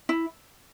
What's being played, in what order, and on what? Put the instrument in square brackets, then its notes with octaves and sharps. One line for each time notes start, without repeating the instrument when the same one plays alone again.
[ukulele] E4